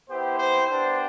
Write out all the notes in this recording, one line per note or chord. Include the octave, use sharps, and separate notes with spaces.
B3 E4 G4 C5
C5
B3 D4 G4 C5